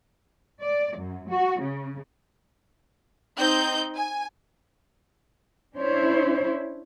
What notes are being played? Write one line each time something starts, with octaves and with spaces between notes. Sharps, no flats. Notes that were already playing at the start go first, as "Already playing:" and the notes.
D5
F#2
F#4
C#3
C4 D#4 G6
G#5
C#4 D4 E4 C5 C#5